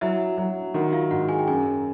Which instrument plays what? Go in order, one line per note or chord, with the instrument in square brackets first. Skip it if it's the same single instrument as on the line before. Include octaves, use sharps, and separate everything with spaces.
[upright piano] F#3 [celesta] E4 E5
[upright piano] F#3
[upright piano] D#3 [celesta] F#4 F#5
[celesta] F4 F5
[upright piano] G#2 [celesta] F#4 F#5
[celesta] G#4 G#5
G5
[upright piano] F#2 [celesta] G#4 G#5